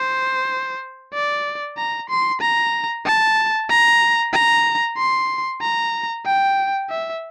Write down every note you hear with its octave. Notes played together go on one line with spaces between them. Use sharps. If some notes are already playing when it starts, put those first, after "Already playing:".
Already playing: C5
D5
A#5
C6
A#5
A5
A#5
A#5
C6
A#5
G5
E5